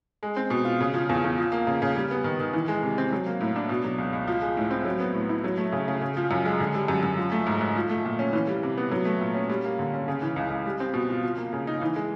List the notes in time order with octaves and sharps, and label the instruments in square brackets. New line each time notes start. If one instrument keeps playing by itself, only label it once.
[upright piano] G#3
C4
B2
F4
C#3
F3
E2
E2
F3
A#3
C#3
C#3
G3
B3
D#3
D#3
E3
G#3
C3
C4
F#3
A#3
A2
D4
B2
F#3
C#2
C#2
F3
G#3
A2
C4
F#3
B3
A2
E4
F#3
A3
C#3
C#3
C#3
F3
F#2
G#3
D3
G3
F#2
F#2
F3
A3
G#2
G#2
F3
A3
A#2
C#4
E3
G3
C3
B3
F#3
A3
A#2
C#4
G3
A#3
D3
C#4
C#3
E3
C#2
C#2
G3
C4
B2
F4
F3
A#3
C#3
D#4
E3
G#3